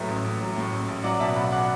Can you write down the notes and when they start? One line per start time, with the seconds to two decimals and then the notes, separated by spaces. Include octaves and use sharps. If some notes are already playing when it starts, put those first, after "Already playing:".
Already playing: A2 F#3 B4 E5
0.08 A1
0.24 A1
0.40 F#3
0.56 A2
0.72 A1
0.88 A1
1.04 F#3 D5 F#5
1.20 B2 E5 A5
1.36 B1 F#5 B5
1.52 D5 F#5